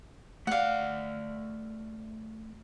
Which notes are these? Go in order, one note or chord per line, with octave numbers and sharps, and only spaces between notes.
A3 D5 F5 F#5